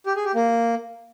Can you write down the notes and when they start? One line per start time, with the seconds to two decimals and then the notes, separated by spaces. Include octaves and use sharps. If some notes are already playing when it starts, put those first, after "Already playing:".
0.06 G4
0.16 G#4
0.25 G4
0.35 A#3